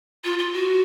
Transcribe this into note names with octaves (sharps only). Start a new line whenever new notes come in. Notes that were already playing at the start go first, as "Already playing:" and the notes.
F4
F4
F#4